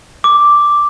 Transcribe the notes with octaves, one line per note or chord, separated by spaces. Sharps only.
D6